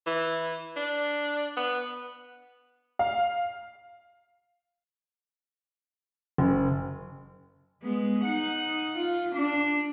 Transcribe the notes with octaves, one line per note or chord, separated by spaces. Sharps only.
E3
D4
B3
F5
F#1
G#3 B3
D#4 F#5
F4
D4